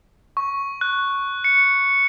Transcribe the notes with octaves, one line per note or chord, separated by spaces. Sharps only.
C#6
F#6
C#7